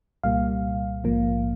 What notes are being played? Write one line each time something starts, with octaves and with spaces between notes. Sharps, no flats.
C2 A#2 G3 A#3 F5
A#1 G#2 F3 A#3